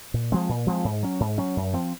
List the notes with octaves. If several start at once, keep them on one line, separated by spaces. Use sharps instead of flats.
A#2
F3 G#3 C4
A#2
F3 G#3 C4
G#2
F#3 C#4
G#2
F#3 C#4
F#2
F3 C4